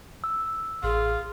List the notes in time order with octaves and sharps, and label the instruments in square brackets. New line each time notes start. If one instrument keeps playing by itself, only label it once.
[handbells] E6
[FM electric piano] A1 [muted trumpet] F4 [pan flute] G#4